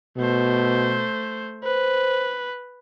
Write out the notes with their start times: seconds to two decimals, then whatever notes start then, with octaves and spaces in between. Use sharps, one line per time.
0.17 B2 A3 C5
1.64 B4 C5